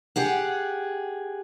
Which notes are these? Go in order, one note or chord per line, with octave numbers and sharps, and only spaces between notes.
G4 G#4 F#5